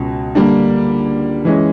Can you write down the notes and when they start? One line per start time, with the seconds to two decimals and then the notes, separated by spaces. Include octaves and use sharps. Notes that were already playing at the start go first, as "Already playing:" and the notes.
Already playing: C#2 B2
0.35 D3 G3 A#3 D4
1.45 E3 G#3 C#4